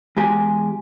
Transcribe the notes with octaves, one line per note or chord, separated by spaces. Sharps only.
E2 G#3 G4 G#5